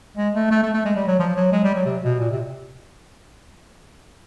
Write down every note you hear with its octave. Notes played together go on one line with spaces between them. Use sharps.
G#3
A3
A3
A3
A3
G#3
G3
F#3
F3
F#3
G#3
G3
F#3
C3
B2
A#2
C3